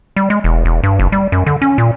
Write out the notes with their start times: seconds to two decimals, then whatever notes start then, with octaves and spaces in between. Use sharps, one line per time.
0.16 G3
0.30 G#3
0.44 E1
0.65 E1
0.83 G2
0.99 F#1
1.12 G3
1.32 F#2
1.46 D3
1.62 C#4
1.78 A#2